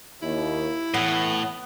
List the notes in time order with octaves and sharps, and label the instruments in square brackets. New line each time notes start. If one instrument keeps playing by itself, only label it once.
[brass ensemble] D#2 [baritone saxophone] E4
[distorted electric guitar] A2 [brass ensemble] E3 [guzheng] B3